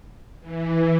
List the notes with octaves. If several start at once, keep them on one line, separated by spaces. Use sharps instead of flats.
E3